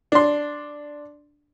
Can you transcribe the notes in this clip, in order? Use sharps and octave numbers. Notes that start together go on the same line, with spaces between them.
D4 C6